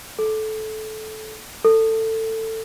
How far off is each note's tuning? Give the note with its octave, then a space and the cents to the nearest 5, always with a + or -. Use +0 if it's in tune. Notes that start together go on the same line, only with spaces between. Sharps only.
A4 -20
A4 +20